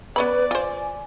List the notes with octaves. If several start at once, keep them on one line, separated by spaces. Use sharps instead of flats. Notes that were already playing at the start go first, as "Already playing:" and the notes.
B3 C#4 B4 D5 B5
F4 C5 G#5